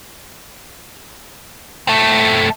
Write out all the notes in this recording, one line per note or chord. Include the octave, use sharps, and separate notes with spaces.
A3 C4